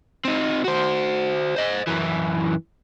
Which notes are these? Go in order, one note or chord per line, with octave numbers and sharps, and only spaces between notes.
C4 D#4
F#4 C5
C5 D#5
F#2 E3